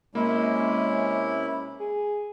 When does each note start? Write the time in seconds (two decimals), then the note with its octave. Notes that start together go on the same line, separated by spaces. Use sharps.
0.15 C3 G#3 A#3 C#4 E4
1.80 G#4